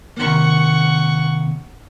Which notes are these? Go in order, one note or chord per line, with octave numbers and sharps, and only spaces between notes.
C3 D#3 A#3 F#5 C#6